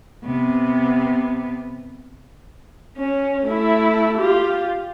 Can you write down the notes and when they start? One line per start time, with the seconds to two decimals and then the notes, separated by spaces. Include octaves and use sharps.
0.25 C3 B3
2.98 C#4
3.44 A3 E4
4.18 F4 G4